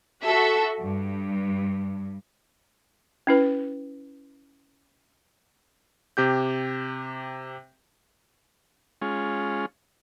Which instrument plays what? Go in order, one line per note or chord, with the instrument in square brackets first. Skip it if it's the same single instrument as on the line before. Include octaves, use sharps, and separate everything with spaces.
[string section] F#4 A4 E5
G2
[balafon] C#4 E4 B4
[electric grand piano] C3 G4 G6
[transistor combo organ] G#3 C#4 F4